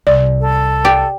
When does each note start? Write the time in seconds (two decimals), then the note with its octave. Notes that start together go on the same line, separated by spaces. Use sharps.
0.07 C2 D5
0.41 A4
0.85 G4 D5